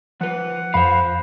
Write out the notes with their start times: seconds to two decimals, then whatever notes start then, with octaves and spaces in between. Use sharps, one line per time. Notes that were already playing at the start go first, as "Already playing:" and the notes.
0.21 F3 B4 F#5
0.74 F2 C5 F5 B5